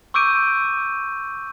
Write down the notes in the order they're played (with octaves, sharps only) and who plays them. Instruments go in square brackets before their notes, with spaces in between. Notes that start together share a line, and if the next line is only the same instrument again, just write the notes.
[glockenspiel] C#6 D6 E6 G6 D7 D#7